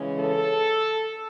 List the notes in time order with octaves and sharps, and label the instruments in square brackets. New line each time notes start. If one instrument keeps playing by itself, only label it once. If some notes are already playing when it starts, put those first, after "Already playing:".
Already playing: [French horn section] C#3 E3 G#3 C#4
A4